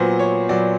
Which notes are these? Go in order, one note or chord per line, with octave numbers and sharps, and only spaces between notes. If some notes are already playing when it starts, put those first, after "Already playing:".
Already playing: A#2 F#3 B3 C5
C#5
A#2 F#3 B3 D5